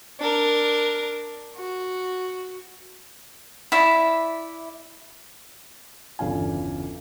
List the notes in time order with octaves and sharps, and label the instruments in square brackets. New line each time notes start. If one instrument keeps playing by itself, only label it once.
[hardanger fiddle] D4 A#4
F#4
[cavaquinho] E4 D5 E5
[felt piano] G1 E2 C#3 F4 F5 G#5